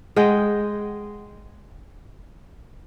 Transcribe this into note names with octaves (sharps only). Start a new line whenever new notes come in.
G#3 D#5 F#5 G5